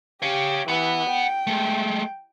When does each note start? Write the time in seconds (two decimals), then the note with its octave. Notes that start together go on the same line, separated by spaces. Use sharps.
0.22 G4 C#5 F5
0.68 E3 F#5 B5
1.11 G5
1.47 G#3 A3